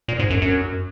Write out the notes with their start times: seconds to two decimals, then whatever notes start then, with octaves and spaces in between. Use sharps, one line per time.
0.08 A#2
0.19 G#2
0.30 F#2
0.42 F#2